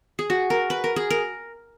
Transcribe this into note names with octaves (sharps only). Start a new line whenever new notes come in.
G#4
F#4
A#4
B4
A#4
G#4
A#4